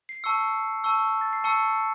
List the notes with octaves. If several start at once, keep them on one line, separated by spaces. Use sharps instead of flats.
C7
A5 C#6 E6 C#7
A5 C#6 E6
A6
C7
A5 C#6 E6 C#7